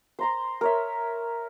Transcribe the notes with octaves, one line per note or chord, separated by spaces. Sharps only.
C5 A#5 C6
A#4 C#5 E5